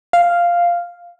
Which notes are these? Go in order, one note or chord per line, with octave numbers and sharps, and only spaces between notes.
F5